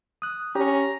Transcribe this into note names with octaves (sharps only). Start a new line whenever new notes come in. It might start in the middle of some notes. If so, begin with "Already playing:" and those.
D#6 F#6
C#4 G4 A#5